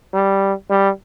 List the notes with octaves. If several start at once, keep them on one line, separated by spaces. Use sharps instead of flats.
G3
G3